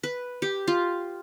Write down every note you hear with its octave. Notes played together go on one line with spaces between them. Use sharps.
B4
G4
F4